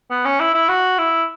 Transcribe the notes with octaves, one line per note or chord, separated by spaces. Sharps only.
B3
C#4
E4
E4
F#4
E4